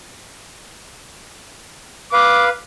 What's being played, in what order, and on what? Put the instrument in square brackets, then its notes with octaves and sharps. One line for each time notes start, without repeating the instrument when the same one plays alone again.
[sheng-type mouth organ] B4 F5 [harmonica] D6